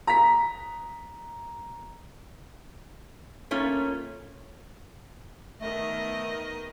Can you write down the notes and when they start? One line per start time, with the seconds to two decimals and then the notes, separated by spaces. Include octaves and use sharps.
0.07 A#5 B6
3.51 A3 A#3 C#4 F4
5.61 D#3 A3 B3 A#4 D#5